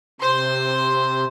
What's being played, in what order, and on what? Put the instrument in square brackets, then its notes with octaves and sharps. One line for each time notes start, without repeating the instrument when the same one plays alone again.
[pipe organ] C3 [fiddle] C5 C6